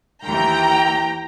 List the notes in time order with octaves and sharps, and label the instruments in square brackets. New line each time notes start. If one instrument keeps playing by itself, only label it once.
[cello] D#2 E3 [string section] G5 A#5